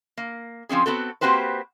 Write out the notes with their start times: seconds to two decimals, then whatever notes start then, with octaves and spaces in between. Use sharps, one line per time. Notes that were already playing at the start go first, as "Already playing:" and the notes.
0.17 A#3
0.69 F3 C4 C#4 G#4
0.86 B3 C4 F#4 A4
1.21 A#3 C4 F#4 G4 B4 C5